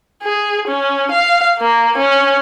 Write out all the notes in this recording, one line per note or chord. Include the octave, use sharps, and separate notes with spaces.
G#4
C#4
F5
A#3
C#4